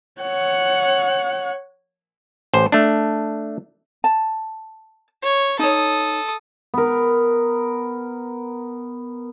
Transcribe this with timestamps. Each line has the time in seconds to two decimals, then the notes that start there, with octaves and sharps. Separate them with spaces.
0.21 C#5 F#5
2.54 A1 C5
2.72 A3 D4
4.04 A5
5.22 C#5
5.59 D#4 A4 C#5 D#6
6.74 B3 A#4